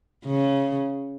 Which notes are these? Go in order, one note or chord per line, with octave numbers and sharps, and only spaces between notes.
C#3